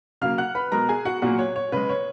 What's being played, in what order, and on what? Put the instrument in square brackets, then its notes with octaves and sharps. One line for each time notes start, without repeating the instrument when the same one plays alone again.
[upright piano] C#3 F#3 A#3 F5 F6
F#5 F#6
B4 B5
B2 G#3 A#4 A#5
G#4 G#5
F#4 F#5
A#2 F#3 A#3 F#4 F#5
C#5
C#5
C#3 G#3 B4
C#5